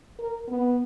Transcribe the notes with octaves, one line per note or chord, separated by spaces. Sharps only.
A#4
B3